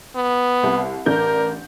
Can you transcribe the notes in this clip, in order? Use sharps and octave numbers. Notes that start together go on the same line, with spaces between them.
B3
C2
A1 D4 A#4 G6